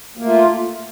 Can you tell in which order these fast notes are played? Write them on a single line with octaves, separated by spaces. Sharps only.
A#3 A3 F4